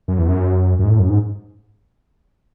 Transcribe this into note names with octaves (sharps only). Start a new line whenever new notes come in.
F#2
E2
F#2
F#2
G#2
A2
F#2
G#2